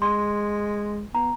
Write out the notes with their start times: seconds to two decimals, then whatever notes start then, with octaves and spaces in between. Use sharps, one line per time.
0.02 G#3 C6
1.15 B3 A#5